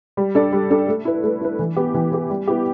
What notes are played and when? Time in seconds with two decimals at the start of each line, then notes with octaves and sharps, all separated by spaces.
0.17 G3
0.35 D4 A4 D5
0.53 G3
0.70 D4 A4 D5
0.87 A3
1.05 E4 B4
1.24 A3
1.41 E4 B4
1.59 E3
1.76 B3 G4
1.94 E3
2.12 B3 G4
2.30 G3
2.47 B3 E4 G4